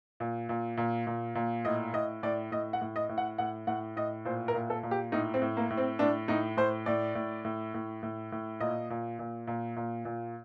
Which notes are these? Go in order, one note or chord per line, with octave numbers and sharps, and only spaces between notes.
A#2
A#2
A#2
A#2
A#2
A2 D#5
A2 D#5
A2 D5
A2 D#5
F#5
A2
D#5
A2
F#5
A2 F#5
A2 F#5
A2 D#5
A#2 C5
A#4
A#2
A4
A#2
G4
A2 D#4
C4
A2
A#3
A2
C4
A2 D4
A2 D#4
A2 C5
A2 D5
A2
A2
A2
A2
A2
A#2 D#5
A#2
A#2
A#2
A#2
A#2